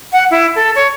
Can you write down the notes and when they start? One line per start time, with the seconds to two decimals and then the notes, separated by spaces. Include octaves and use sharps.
0.13 F#5
0.31 E4
0.56 A4
0.76 C#5